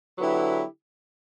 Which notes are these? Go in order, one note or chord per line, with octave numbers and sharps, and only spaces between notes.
D3 F#3 B3 E4 G4